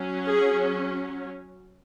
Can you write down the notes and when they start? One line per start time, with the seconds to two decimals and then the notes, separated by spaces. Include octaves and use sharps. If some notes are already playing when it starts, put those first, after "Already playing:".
Already playing: F#3 C#4
0.28 G#4